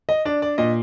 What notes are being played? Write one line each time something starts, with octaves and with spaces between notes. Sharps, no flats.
D#5
D4 D5
D5
A#2 D#5